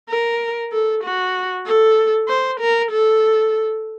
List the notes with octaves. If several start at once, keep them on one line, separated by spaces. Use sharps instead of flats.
A#4
A4
F#4
A4
C5
A#4
A4